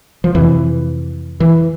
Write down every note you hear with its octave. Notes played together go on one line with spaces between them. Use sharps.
F3
F2 C3 E3
E3